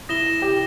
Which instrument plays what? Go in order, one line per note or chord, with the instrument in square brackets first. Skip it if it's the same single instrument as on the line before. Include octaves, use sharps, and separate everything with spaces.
[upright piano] E4 [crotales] D#6 A#6 E7 G7
[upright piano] G4